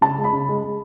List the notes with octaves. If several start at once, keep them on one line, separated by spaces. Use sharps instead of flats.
C#3 A5
G#3
B5
C#3
G#3
G#3